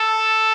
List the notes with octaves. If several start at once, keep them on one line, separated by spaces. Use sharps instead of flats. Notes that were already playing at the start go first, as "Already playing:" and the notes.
Already playing: A4